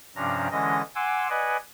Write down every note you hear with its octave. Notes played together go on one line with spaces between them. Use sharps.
G2 C3 F3 C#4 D4 A#5
D3 E3 G#3 C#4 D#5 A#6
F#5 G#5 C6 D6 E6
B4 D5 D#5 F#5 G#5